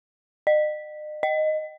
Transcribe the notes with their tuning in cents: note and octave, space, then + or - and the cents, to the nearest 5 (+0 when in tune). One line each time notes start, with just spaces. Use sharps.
D#5 -40
D#5 -5